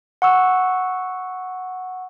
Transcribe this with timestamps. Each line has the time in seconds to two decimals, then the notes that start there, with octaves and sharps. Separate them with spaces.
0.22 F#5 C#6 E6